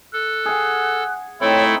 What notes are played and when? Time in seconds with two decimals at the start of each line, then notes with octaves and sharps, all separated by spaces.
0.13 A4 F#6
0.46 G#4 F#5
1.41 A3 C4 D#4 E4 A4 C#5